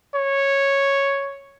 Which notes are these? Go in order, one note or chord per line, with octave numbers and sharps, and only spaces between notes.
C#5